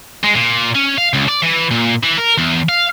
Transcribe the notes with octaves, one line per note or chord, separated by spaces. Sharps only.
G#3
A#2
C#4
F5
C#2
D5
E3
A#2
E3
A#4
E2
F5